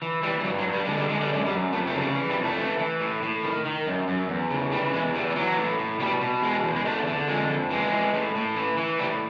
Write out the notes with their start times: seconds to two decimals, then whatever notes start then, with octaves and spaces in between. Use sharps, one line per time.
0.02 E3
0.23 E3 G3
0.40 G3
0.44 G2 F#3
0.59 F#3
0.66 G2
0.73 G3
0.85 D3 G#3
0.97 G3
1.08 D3 G#3
1.21 G3
1.30 F#2 G#3
1.46 G3
1.51 F#2
1.73 F2 A3
1.87 A3
1.94 C#3 F#3
2.01 G3
2.15 E3
2.30 G3
2.37 F2
2.44 A3
2.58 E3
2.79 E3
3.01 A2
3.22 A2
3.43 D#3
3.65 D#3
3.86 F#2
4.08 F#2
4.29 E2
4.50 C#3
4.72 E3 G3
4.93 E2 G#3
5.15 E3 G3
5.30 G3
5.36 E3 F#3
5.57 A2
5.78 A2
6.00 B2 G3
6.21 B2
6.43 E2 G#3
6.64 E2
6.76 G#3
6.85 D3 A3
7.07 D3
7.28 F2 G#3
7.49 F2
7.70 E3 G#3
7.92 E3
8.14 A2
8.35 A2
8.56 E3
8.77 E3
8.99 A2 G3